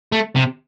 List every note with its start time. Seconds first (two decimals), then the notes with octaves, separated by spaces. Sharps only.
0.12 A3
0.36 C3